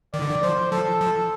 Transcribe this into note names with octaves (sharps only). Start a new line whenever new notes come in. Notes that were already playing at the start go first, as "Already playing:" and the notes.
D#3 D5
D3
D#3
F3 C5
F3 A4
F3